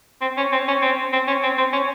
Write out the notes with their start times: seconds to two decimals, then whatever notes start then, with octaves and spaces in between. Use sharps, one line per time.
0.22 C4
0.38 C#4
0.53 C4
0.68 C#4
0.82 C4
1.13 C4
1.28 C#4
1.43 C4
1.58 C4
1.73 C#4